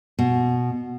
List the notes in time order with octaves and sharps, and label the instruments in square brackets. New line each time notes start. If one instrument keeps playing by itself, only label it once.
[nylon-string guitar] B2